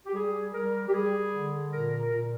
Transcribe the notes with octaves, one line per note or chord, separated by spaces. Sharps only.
G4
G3 G#4
G3 A#4
G4
G3 G#4
D3
A#2 A#4
A#4
A#2